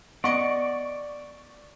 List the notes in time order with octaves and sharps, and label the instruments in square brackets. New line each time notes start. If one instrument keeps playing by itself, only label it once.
[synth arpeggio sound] B3 D#5 C#7 [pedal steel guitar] D5 [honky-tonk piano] C#6